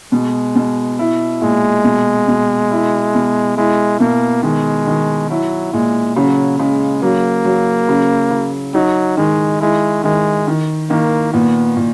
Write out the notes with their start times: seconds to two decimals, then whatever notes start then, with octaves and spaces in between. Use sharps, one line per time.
0.12 B2 G#3
0.55 B2
0.99 E4
1.41 A#2 G#3
1.84 B2
2.28 B2
2.71 E4
3.15 B2
3.57 G#3 E4
4.00 B2 A#3
4.43 D#3 G#3
4.87 D#3
5.30 F#3 E4
5.73 A#2 G#3
6.16 C#3 F#3
6.59 C#3 G#3
7.02 F#3 A#3
7.45 F#3
7.89 C#3
8.31 C#3
8.74 F#3 D#4
9.17 D#3 G#3
9.60 G#3 E4
10.04 D#3 G#3
10.47 D#3
10.90 D#3 A#3
11.33 A#2 B3
11.77 A#2